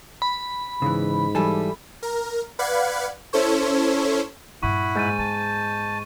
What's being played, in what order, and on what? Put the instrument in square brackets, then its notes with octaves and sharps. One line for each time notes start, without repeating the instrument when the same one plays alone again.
[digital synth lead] B5
[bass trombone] G#2 [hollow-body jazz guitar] C#3 E3
[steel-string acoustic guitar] E3 G3 G#5 [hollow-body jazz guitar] A4
[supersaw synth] A#4
B4 D5 F5 F#5 B5 G#6
C#4 E4 A4 C5 C#5
[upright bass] G2 A#2 [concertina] E4 F#5 B5 [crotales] C#6
[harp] G#2 [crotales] G6 A6 D#7
[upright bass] B3 [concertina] A5